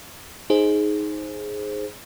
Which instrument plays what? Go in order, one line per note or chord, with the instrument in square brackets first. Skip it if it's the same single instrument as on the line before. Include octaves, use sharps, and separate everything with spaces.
[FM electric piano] D#4 G#4 C5